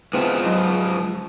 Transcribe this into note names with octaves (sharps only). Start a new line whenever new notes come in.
G#2 E3 F3 B3 C4
F#3 G#3 D#4